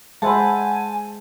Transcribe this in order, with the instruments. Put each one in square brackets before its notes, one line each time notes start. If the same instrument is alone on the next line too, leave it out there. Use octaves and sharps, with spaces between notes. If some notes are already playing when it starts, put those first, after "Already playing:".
[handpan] G#3 C5 E5 [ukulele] F#5 B5 [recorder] G#5 [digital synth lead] A5